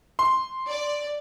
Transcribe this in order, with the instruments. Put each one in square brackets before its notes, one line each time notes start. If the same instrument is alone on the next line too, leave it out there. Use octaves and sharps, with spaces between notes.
[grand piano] C6
[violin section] D5